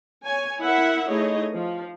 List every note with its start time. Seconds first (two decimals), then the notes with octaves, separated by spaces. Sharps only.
0.24 C#5 G#5
0.60 E4 A#4 E5 F#5
1.09 A3 D#4 E4 G#4 C#5 D#5
1.53 F3